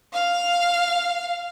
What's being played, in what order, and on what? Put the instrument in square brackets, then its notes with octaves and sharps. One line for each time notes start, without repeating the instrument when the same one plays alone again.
[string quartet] F5